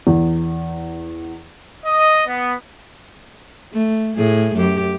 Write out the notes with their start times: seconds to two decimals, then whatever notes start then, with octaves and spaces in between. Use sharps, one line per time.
0.07 E2
1.85 D#5
2.26 B3
3.73 A3
4.16 A2 A3 G#4
4.56 F#2 G4